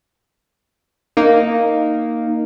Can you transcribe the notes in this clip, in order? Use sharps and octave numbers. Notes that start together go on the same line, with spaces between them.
A#3 D#4